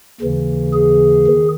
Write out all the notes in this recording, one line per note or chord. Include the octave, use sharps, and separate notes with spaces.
D#2 C#3 E3
G#4
D#3